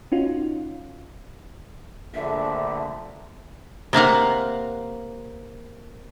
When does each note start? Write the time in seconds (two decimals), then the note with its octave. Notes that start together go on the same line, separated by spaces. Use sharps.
0.12 C#4 D#4 F4 F#4
2.15 A#1 D3 A3 E5
3.93 C3 A#3 F5 F#5